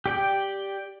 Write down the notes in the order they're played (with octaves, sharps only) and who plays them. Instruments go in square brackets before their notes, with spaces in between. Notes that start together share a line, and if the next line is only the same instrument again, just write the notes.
[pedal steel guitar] G4 D5 G5